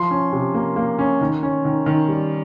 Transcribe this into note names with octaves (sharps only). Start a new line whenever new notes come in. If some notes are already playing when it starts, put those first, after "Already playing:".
Already playing: F3 C6
C#4
C3
A#3
A#3
C#4
D#3
C#4
D#3
D#3
G3